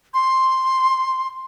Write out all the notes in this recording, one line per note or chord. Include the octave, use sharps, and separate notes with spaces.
C6